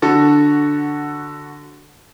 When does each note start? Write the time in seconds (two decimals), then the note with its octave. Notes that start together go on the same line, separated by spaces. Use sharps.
0.02 D3 F#4 A4